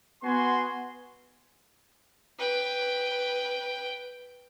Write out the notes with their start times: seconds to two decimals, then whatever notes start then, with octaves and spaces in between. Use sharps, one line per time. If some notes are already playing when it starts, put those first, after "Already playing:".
0.23 B3 F#4 G#5 C6
2.39 B4 G5